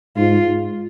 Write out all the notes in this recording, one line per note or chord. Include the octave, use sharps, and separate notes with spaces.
G#2 F4